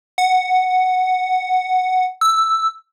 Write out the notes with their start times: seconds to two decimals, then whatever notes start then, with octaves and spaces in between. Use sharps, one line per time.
0.18 F#5
2.21 E6